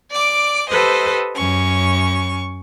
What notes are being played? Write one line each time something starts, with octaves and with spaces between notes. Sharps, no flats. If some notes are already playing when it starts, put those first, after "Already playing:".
D5 D6
G4 A4 B4 C5 D#5
F#2 C#4 C#6